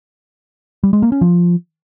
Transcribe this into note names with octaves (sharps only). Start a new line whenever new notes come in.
G3
G#3
A#3
C#4
F3